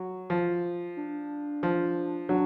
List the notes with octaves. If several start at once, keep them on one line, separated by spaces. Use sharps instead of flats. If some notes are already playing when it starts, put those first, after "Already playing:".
Already playing: F#3
F3
D4
F3
F#3 D4